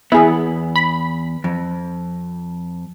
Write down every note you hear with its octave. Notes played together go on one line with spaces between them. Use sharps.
E2 B3 E4 G#4
B5
F2